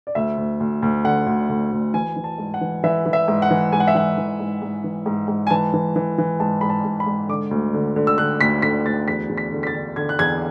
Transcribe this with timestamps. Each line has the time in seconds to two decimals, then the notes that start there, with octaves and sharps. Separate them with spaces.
0.07 D5
0.15 D2 E5
0.38 D2
0.60 D2
0.82 D2
1.04 D3 F#5
1.27 D2
1.49 D2
1.72 D2
1.94 E3 G#5
2.16 E3
2.24 A5
2.38 G#2
2.54 F#5
2.61 E3
2.84 E3 E5
3.06 E3
3.13 E5
3.28 G#2
3.42 F#5
3.51 E3
3.72 G#2 G#5
3.80 F#5
3.88 E5
3.95 E3 F#5
4.18 E3
4.40 G#2
4.62 G#2
4.84 E3
5.06 G#2
5.28 G#2
5.47 G#5
5.50 E3 A5
5.74 E3
5.96 E3
6.18 E3
6.40 G#2 A5
6.61 G#2 B5
6.69 A5
6.85 G#2
7.00 B5
7.06 G#2
7.29 D3 D6
7.51 D2
7.74 D3
7.96 D3
8.07 E6
8.18 D3 F#6
8.41 D2 B6
8.62 D3 B6
8.86 D2 A6
9.08 E2 B6
9.29 E2
9.38 B6
9.52 D3
9.63 B6
9.67 A6
9.74 D3
9.96 D3 G#6
10.09 F#6
10.19 E2 G#6